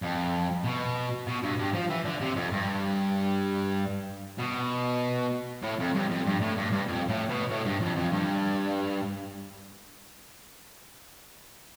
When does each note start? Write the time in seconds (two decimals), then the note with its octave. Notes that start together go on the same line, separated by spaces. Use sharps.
0.02 F2
0.65 B2
1.27 B2
1.43 G2
1.58 G2
1.74 F3
1.90 E3
2.05 D3
2.21 C3
2.36 F2
2.52 G2
4.39 B2
5.63 A2
5.79 F2
5.95 G2
6.10 F2
6.26 G2
6.42 A2
6.57 G2
6.72 G2
6.88 F2
7.09 A2
7.29 B2
7.50 A2
7.66 G2
7.81 F2
7.97 F2
8.12 G2